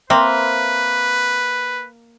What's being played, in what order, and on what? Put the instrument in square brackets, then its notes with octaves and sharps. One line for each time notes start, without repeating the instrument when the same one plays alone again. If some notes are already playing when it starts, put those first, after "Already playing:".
[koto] A#3 [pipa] C4 C5 E5 [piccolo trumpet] B4